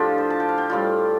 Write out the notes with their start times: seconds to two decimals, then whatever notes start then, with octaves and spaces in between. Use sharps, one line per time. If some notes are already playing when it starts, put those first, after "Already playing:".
Already playing: A2 F3 D4 F4 G4 A4
0.18 C5
0.30 A5
0.40 G5
0.49 F5
0.58 G5
0.70 A2 G3 F4